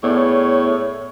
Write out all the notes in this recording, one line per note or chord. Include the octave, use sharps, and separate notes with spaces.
A2 B3 G#4 C#5 D5